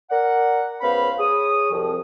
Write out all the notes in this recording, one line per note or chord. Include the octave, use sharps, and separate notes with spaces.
A#4 D5 F#5
C#2 B3 C#4 C5 F5 B5
G#4 C#5 D#6
C2 F2 F3